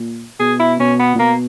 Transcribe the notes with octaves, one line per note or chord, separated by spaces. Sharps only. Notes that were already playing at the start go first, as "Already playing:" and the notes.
Already playing: A#2
B2 G#4
E4
B2 C#4
B3
A#2
B2 A#3